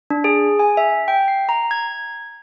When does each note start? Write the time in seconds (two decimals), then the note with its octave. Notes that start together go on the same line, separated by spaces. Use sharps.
0.10 D4
0.24 G#4
0.59 G#5
0.77 E5
1.08 G5
1.28 C7
1.49 A#5
1.71 G#6